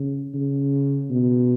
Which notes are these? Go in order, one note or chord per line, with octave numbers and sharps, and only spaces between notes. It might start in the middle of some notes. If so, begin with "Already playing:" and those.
Already playing: C#3
C#3
B2